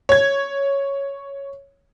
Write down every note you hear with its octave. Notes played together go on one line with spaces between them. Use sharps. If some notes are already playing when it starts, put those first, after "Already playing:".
C#5 G#6